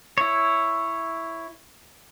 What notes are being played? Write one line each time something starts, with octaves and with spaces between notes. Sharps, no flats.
E4 C#5